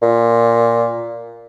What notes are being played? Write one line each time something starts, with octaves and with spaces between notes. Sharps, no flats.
A#2